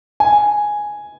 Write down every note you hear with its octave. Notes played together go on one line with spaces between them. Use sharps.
G#5